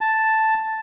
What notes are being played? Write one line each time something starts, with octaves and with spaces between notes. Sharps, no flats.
A5